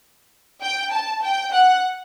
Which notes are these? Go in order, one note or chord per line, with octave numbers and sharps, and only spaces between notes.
G5
A5
G5
F#5